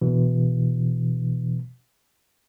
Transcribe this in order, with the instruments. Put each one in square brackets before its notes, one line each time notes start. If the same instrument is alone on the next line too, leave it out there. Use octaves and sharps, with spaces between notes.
[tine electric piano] B2 E3